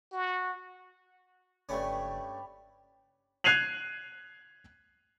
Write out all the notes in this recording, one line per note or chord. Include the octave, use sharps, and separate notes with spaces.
F#4
F#1 G2 A3 C#4 G4 B4 D5
F#6 G#6 C7 D#7 F7 F#7